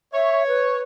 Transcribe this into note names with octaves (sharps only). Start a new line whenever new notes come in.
C#5 E5
B4